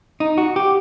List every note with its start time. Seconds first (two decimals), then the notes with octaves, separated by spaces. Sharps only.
0.20 D#4
0.38 F#4
0.56 G4